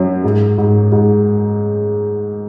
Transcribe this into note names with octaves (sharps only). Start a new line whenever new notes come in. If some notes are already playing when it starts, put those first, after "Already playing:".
Already playing: F#2 F#3
G#2
G#2
G#2